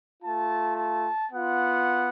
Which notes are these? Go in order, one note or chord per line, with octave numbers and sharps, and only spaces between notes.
A3 F4 A5
A5
B3 F4 F#5